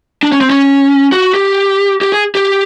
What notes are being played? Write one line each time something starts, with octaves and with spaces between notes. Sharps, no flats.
D4
C#4
C4
C#4
F#4
G4
G4
G#4
G4